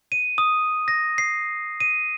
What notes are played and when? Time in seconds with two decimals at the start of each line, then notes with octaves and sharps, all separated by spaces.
0.12 D#7
0.38 D#6
0.88 A#6
1.18 C7
1.80 D#7